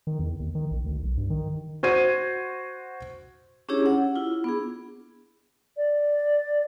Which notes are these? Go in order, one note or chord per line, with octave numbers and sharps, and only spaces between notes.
D#3
E2
D#2
D#3
A#1
D2
B1
G2
D#3
F#4 C5 G#6 D#7
C#4 D4 E4 G4 G#4 C#5
F#5
E4 F4
B3 D4 G#4
D5